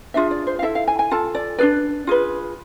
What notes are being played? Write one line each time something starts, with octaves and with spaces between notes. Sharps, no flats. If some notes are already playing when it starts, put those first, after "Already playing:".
D4 F4 G#4 E5
D5
C5
F5
E4 A4 E5
F5
G#5
G#5
F4 A4 A5
D5
D4 G#4 B4 D5
F4 G#4 B4